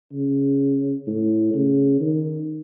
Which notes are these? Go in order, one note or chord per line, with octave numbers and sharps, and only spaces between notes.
C#3
A2
C#3
D#3